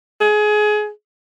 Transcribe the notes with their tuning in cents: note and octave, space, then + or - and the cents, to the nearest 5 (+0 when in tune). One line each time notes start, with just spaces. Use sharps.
G#4 +25